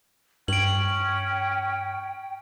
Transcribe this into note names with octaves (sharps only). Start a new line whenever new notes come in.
G2 C#4 G5 D7 F#7